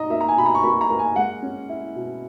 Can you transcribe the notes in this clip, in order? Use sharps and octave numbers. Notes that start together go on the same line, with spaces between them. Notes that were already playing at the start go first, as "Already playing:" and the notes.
Already playing: B2 D#4 D#5 A#5
A#3 E5
A#5
G#5
B2 B5
A#5
C#6
A#3 B5
A#5
A#3
G#5
G#3 F#5
C#4
E4
B2